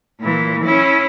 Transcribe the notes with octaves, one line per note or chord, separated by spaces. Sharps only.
A#2 E3
C#4 E4